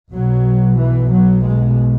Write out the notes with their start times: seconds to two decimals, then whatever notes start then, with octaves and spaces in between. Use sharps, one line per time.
0.12 B1 B2 F#3
0.78 E3
1.10 F#3
1.44 G#3